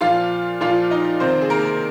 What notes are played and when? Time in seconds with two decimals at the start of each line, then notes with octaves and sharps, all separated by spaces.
0.01 A#2 F3 F4 F5
0.61 A#2 F3 F4 F5
0.91 D#4 D#5
1.20 C3 D#3 C4 C5
1.42 G#4
1.50 A#3 A#4